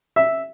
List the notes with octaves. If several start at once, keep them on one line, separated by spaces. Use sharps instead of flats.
E5